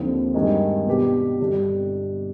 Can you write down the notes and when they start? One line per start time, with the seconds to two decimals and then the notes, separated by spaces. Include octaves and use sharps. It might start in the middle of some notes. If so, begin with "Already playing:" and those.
Already playing: D#2 D3 F3 C4
0.34 G2 D#3 G#3
0.87 B2 B3 D4 G4
1.40 G1 G2 D3 G3 D4